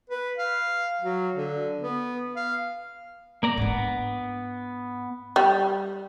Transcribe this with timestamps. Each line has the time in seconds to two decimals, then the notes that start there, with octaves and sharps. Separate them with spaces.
0.10 B4
0.38 F5
1.02 F#3
1.35 D3
1.83 B3
2.36 F5
3.43 A#3 D5 A#5
3.57 G#2 B3 D4
5.36 G3